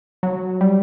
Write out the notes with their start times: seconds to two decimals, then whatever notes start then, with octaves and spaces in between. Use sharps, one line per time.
0.23 F#3
0.61 G3